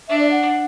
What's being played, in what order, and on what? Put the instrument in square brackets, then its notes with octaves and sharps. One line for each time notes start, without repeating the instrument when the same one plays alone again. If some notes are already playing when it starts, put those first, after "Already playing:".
[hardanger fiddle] D4 [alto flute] E5
[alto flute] D5
F#5